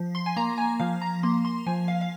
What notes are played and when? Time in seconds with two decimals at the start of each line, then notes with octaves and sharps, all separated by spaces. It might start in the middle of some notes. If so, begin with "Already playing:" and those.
Already playing: F3
0.15 C6
0.26 G#5
0.36 A#3 A#5
0.58 G#5
0.79 F3 F5
1.02 A#5
1.23 A#3 C6
1.45 C6
1.66 F3 G#5
1.88 F5
2.01 F5